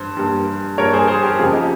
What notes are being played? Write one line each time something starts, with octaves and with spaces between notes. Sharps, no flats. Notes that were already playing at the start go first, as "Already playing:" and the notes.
Already playing: G2 C5
G2 G3 A#3
G2 G3 A#3 A#4 C#5
G#4 C5
G#4 C5
G4 A#4
F2 C#3 F3 F4 G#4
D#4 G4